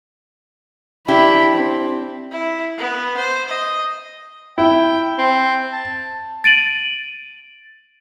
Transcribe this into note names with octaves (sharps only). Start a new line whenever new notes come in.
D4 E4 G4 E5 B5
C4
E4
B3
C5
D#5
E4 G5
C4
A5
A6 D7 D#7 F#7